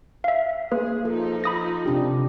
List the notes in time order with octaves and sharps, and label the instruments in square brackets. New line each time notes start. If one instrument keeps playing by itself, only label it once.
[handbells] E5 F5
[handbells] A#3 B4 [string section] G#4
[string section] F3 D#4 [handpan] A4
[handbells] B5 D#6 A#6
[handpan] C3 D4 G4